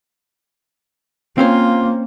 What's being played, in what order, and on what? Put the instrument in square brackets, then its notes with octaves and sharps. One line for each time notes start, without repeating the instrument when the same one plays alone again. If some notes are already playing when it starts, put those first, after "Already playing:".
[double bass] A#3 [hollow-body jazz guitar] C4 C#4 C5 [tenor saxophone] F4